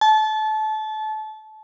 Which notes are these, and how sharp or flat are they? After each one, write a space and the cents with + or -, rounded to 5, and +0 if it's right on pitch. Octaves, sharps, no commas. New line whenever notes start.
A5 -25